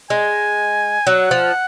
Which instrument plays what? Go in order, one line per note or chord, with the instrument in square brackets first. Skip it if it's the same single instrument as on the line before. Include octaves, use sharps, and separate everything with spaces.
[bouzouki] G#3 [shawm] G#5
[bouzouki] F#3 [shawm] F#5
[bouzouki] F3